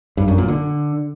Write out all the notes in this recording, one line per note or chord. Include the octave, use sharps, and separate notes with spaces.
G2
F#2
A#2
D3